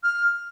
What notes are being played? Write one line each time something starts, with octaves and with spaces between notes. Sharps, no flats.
F6